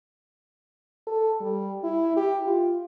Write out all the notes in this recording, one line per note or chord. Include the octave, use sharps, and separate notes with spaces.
A4
G3
E4
G4
F4